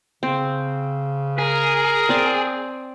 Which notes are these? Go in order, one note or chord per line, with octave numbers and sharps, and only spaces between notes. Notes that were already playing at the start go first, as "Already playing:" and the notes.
C#3 C4
G#4 A#4
C4 D5